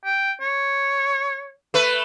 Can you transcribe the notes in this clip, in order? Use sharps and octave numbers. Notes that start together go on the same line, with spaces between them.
G5
C#5
A3 B4